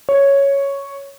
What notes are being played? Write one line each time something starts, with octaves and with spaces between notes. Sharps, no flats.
C#5